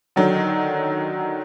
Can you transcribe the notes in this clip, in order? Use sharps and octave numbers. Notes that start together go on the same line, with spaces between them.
D3 D#3 F#3